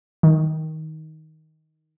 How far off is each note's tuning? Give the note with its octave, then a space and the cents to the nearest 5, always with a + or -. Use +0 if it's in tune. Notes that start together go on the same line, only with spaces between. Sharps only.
D#3 +10